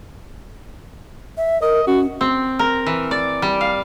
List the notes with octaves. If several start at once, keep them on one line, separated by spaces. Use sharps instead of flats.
E5
A#4 D#5
C#4 F#4
C4
A#4
E3
D5
G3
F5